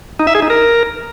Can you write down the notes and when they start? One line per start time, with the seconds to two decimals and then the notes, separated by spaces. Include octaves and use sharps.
0.19 D#4
0.27 E5
0.35 G#4
0.42 D#4
0.50 A#4